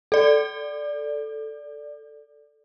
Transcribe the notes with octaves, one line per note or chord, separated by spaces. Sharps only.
A4 D5